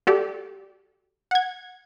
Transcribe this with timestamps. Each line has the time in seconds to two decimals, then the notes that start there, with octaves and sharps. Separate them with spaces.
0.07 F#4 G4 A4 D5
1.31 F#5 G#6